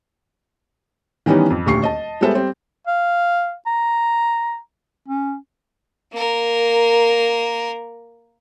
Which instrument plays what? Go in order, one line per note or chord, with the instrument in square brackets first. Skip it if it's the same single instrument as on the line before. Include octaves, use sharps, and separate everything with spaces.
[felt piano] D#3 E3 G3 B3 C#4 D#4
F2
D#1 D2 G4 C#6 C7
D#5 A5
G3 G#3 B3 A4 C5 E5
G3 C4
[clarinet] F5
A#5
C#4
[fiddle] A#3 A#4